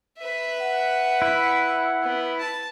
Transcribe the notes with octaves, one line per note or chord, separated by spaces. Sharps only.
B4 E5
F#5
E4
B3
A5